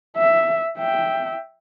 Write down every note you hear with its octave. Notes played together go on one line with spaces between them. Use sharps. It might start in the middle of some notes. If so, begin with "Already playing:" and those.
E5
E5 G5